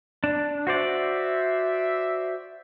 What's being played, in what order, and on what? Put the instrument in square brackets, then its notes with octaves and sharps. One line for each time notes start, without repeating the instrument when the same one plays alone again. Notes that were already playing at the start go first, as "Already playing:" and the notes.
[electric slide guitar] D4
[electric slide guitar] F#4 C5 D5 [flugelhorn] E5